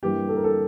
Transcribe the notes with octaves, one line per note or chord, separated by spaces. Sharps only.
G2 E3 G3 A#3 G4
A4
A#4
A4